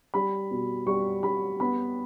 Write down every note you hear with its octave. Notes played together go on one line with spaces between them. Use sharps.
G3 B5
B2
G3 C#6
G3 B5
B3 B5